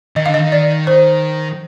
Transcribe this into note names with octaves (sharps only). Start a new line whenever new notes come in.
D#3 D#5
D3 F5
D#5
D#3
D5
C5